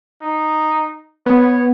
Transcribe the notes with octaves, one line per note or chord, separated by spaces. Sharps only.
D#4
B3 C#5